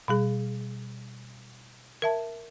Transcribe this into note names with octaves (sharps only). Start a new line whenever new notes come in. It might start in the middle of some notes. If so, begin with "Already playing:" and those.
B2 G3 G#4
A#4 E5 A5